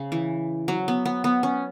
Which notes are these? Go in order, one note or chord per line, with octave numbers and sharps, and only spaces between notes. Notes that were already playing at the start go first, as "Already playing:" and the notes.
Already playing: C#3
E3
F#3
B3
B3
B3
C#4